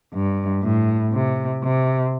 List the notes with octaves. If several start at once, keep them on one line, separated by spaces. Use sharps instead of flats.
G2
A2
C3
C3